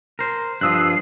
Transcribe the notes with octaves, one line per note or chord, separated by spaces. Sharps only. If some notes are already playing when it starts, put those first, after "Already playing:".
A#4 C5
G2 F3 D#6 E6 F#6 C7